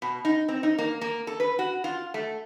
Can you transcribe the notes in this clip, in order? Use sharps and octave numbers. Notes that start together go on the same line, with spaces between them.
B2
D#4
C4
D#4
A#3
A#3
A4
B4
F#4
F4
A3